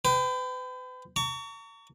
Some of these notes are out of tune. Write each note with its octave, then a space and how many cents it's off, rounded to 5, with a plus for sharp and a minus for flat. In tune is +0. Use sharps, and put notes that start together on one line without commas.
B4 +40 G5 +0
A#5 -40 C#6 +30